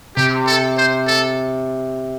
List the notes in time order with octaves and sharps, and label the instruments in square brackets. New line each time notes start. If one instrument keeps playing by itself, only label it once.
[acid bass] C3 [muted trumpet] G4
[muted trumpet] A4
C5
A4